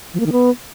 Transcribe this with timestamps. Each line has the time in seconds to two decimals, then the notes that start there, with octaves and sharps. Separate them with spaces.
0.14 F3
0.20 A#3
0.26 D#3
0.32 B3